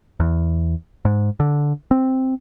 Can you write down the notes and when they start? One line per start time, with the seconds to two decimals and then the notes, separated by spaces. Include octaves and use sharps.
0.20 E2
1.05 G#2
1.40 D3
1.91 C4